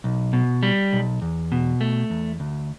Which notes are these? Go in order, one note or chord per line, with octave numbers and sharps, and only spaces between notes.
B1
B2
G3
B1
E2
B2
A3
E2
D2